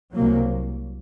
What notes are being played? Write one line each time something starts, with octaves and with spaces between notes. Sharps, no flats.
C2 C3 F#3 A#3